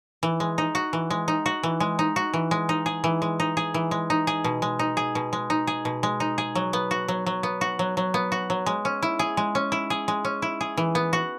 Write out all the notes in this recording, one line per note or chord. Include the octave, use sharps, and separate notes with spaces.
E3
G#3
D#4
F#4
E3
G#3
D#4
F#4
E3
G#3
D#4
F#4
E3
G#3
D#4
G#4
E3
G#3
D#4
G#4
E3
G#3
D#4
G#4
B2
G#3
D#4
G#4
B2
G#3
D#4
G#4
B2
G#3
D#4
G#4
F#3
B3
F#4
F#3
F#3
B3
F#4
F#3
F#3
B3
F#4
F#3
G#3
C#4
E4
G#4
G#3
C#4
E4
G#4
G#3
C#4
E4
G#4
E3
B3
F#4